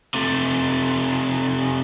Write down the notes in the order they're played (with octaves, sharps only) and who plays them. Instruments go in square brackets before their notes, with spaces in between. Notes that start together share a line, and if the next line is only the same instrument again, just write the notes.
[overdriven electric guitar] C3 A3